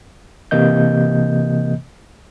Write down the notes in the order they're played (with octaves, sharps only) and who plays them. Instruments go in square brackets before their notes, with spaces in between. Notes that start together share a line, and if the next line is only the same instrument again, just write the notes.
[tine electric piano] C3 E3 A#3 D#5 G6